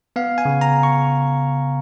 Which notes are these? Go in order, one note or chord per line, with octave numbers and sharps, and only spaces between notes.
B3 F5
G#5
C#3
A#5
C#6